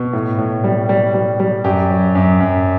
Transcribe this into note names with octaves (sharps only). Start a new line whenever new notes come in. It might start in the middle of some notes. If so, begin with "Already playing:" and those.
Already playing: B2
A2
A2
G3
G3
G3
G3
F#2 G4
F#3
F#2
F#2